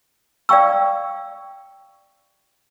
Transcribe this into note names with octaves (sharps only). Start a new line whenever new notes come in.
D5 F5 G5 C#6 E6